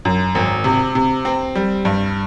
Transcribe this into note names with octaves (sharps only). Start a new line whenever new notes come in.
F#2
G#1
C3
C3
C4
G3
G2